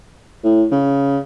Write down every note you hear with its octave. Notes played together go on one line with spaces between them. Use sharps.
A2
C#3